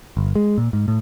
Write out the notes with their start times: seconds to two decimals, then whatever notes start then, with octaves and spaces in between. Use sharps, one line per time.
0.17 G1
0.35 G#3
0.58 A#2
0.73 G#2
0.88 A2